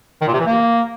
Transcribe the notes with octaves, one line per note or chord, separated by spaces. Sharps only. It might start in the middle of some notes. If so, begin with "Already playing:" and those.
D#3
A#2
C3
E3
A#3